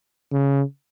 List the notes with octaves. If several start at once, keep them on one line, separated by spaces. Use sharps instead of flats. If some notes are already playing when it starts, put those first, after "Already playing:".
C#3